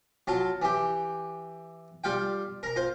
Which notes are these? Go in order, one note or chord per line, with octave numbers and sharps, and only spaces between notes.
F#3 F4 A5
E3 G4
G3 F4 F5 G5
A#4 A#5
F4 C5